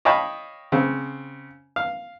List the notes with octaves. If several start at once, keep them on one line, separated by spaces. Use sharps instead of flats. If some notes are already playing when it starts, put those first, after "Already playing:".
C#5 D#5 F5 G5 A5 B5
C#3 C4
F5